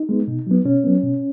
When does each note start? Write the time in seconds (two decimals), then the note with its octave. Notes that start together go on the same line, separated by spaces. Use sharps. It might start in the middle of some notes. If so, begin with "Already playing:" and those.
Already playing: D#4
0.09 G#3 B3
0.28 B2
0.47 F#3 B3
0.65 B2 C#4
0.84 F#3 B3
1.03 B2